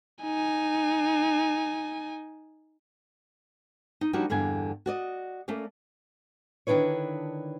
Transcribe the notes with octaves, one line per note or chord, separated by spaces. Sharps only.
D#4 G#5
D#4
F3 G3 A#3 D4 D#4 F#4
E2 G2 D3 A#3 G#5
F#4 D5 D#5
A3 A#3 C#4 D5
D3 D#3 D4 E4 B4 C#5